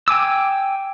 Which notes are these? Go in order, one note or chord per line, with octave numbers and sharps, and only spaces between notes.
G5 G#5 D6 E6